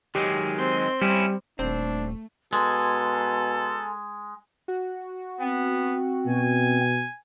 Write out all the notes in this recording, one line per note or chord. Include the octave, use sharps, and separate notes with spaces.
D#3 F#3 G#3 G4
C4
G3 C#4 E4
D#1 A3 C4 D4
B2 G#3 A4 G#5 A#5 C6
F#4
B3 C4
B2 G#5